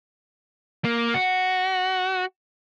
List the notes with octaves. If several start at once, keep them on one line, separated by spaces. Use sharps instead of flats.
A#3
F#4